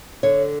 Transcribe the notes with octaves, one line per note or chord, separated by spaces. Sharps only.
D3 C#5